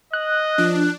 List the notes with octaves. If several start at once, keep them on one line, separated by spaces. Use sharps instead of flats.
D#5 F#6
F3 D4